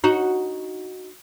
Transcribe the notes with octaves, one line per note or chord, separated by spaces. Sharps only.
D#4 F#4